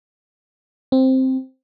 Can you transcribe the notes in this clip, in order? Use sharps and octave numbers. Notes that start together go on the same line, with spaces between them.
C4